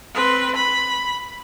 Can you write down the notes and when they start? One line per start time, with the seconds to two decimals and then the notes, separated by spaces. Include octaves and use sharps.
0.14 C4 B4
0.55 B5